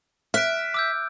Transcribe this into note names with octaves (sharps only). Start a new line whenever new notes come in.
E5 F6 F#6 D7
D6 E6 G6